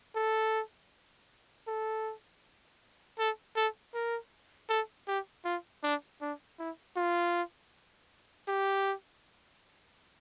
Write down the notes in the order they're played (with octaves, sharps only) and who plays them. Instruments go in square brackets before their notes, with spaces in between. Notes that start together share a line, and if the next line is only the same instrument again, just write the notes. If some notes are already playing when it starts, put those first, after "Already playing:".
[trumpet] A4
A4
A4
A4
A#4
A4
G4
F4
D4
D4
E4
F4
G4